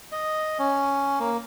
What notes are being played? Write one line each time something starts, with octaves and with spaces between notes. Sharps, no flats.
D#5
C#4
A#3